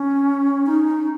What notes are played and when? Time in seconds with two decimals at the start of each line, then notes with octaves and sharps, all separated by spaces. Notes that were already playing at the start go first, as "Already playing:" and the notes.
Already playing: C#4
0.66 D#4